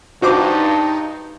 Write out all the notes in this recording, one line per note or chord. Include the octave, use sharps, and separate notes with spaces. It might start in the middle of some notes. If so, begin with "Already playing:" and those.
G2 D#4 F#4 C5 D6